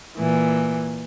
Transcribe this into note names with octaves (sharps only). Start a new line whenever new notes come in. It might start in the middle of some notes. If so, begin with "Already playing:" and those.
A#2 E3